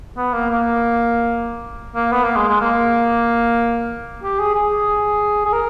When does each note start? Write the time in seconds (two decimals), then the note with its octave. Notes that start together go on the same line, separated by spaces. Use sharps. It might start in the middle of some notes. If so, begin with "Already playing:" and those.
0.17 B3
0.33 A#3
0.50 A#3
1.95 A#3
2.12 B3
2.24 A#3
2.36 G#3
2.48 G#3
2.60 A#3
4.23 G4
4.39 G#4
4.54 G#4
5.45 G#4
5.53 A#4